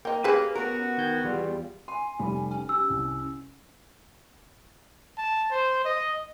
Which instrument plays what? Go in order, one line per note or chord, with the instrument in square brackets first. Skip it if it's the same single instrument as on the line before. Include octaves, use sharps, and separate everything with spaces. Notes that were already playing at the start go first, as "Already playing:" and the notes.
[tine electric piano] A#3 [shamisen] D#5 G5
[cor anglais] A#3 [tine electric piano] C#4 [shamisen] G4 G#4 [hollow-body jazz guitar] B4
[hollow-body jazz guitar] B3 A#4 [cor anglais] F#4
[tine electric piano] D#3 G6 G#6
E2 G3 F4
[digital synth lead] G#5 [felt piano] C6
[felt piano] F1 G3 B5
[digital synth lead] C#4
[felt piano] G4 [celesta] E6
[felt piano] C2
[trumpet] A5
C5
D#5